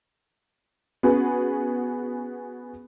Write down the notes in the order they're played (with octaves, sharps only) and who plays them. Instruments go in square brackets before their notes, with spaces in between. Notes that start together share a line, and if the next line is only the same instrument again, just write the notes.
[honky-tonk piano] B3 C#4 F#4 G#4 B4